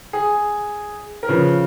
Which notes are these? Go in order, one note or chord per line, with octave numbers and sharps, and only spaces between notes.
G#4
A#4
C#3 F3 B4